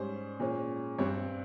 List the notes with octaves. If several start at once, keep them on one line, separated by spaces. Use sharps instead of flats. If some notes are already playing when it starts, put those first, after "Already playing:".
Already playing: G#2 G3 C#4 C5
A#2 G#3 C#4
G2 G3 C4 C#5